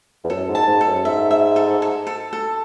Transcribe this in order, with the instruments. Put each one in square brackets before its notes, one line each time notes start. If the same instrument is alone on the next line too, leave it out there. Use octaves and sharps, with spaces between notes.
[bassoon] E2
[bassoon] F#2 [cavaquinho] A4
[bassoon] G#2
[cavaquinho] A5
[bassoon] G#2
[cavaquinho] A4
[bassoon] F#2
[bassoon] G#2 [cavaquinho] E5
[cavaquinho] E5
A4
A4
A4
A4